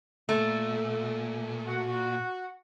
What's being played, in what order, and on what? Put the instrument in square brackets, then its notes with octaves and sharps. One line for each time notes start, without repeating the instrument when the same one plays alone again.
[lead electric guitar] A#2 [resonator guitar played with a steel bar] A3
[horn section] F#4